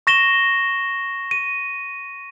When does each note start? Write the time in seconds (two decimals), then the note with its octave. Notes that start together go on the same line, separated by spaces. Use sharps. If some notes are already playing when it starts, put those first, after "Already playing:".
0.07 C#6 A#6 E7 G7
1.31 D#7